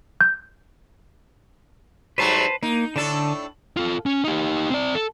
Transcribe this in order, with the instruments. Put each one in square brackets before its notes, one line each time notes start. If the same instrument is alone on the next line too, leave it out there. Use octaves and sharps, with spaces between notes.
[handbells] G6
[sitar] G#2 F#3 G3 [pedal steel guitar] B4 C5 A5
[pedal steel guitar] A#3 [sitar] D#4
[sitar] A2 D4 A4 [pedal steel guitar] D3 A5
[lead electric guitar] F4 A4
C#4
D#4 G4
C4 D5
A4